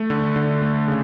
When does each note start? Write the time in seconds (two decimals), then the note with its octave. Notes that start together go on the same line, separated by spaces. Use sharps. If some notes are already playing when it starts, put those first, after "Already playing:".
Already playing: A3
0.10 D3
0.36 D3
0.62 A3
0.88 C#3